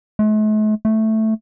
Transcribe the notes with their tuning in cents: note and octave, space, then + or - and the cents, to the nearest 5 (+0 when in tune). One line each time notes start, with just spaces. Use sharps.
A3 -45
A3 +0